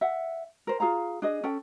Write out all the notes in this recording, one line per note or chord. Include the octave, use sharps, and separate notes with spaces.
E5 F#5
A#4 C5
F4 G#4 F5 A#5
D4 G#4 D#5
C#4 A4 G5